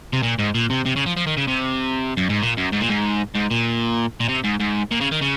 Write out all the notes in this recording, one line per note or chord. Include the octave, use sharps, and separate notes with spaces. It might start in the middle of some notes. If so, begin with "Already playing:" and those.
C3
A#2
G#2
A#2
C3
C3
C#3
F3
F3
D#3
C#3
C3
F#2
G#2
A#2
F#2
G#2
A#2
G#2
G#2
A#2
A#2
C3
G#2
G#2
A#2
C#3
D#3
C#3